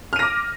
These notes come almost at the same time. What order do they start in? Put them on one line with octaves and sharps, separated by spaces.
F6 D#7 A#6 D6